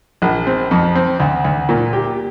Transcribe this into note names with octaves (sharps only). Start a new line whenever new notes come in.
A#1
C4
F2
C4
D2
D2
A#2
G4